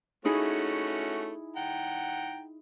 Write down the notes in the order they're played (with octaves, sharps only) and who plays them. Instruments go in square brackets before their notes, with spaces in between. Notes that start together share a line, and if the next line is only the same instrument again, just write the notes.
[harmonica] A3 C#4 F#4 [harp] D#4 E4 G#4
[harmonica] F#5 G5 A#5